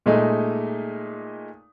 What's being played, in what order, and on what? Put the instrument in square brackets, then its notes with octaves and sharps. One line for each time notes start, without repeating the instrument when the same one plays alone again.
[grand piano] A#2 G#3 A3 D#4